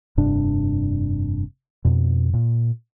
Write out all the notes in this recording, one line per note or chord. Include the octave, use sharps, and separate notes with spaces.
F1 G2 C3 D4
F2 B2
A#2